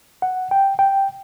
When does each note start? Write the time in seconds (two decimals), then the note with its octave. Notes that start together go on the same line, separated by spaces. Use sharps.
0.22 F#5
0.51 G5
0.79 G5